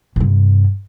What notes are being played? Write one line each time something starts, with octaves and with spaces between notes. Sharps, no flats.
G2 C3